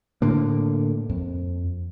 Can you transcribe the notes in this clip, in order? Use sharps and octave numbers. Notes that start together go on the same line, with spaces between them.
A2 D3 A#3
F2